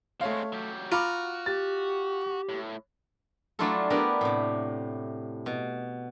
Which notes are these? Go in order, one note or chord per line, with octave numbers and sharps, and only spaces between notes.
G#3 A3 C4 C#5 F5
F#3 G4
F4 F#4 A#5 B5 D6
G4 A6
A2
F#3 A3 D4 E4 F4 A4
B3 D4 E4 G4 A#4
A2 C3
B2